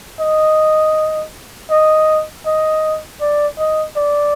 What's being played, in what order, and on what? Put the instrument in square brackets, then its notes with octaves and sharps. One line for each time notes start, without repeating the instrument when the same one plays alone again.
[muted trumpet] D#5
D#5
D#5
D5
D#5
D5